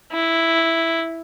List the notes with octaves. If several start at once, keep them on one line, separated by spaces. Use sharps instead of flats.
E4